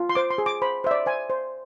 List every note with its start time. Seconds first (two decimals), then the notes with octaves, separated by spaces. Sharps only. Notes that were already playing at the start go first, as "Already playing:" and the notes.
Already playing: F4
0.09 C6
0.15 C5 D6
0.31 C6
0.38 G#4
0.46 D6
0.62 C5 B5
0.84 C5 E5
0.91 D5
1.06 C5 G#5
1.30 C5